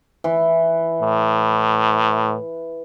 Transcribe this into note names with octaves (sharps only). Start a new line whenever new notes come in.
E3
A2